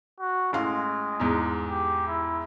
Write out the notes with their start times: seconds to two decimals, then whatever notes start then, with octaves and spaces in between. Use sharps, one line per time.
0.20 F#4
0.53 A1 G#3 F5 C6
1.20 E2 G#2
1.70 G4
2.07 E4